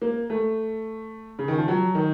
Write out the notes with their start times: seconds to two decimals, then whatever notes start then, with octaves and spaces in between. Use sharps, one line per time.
0.02 A#3
0.30 A3
1.39 C#3
1.48 D#3
1.58 F3
1.68 F#3
1.95 D#3